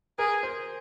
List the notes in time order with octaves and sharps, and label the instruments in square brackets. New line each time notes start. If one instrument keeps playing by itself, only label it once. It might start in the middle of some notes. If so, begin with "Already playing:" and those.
[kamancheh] G#4 [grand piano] A#4
[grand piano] C5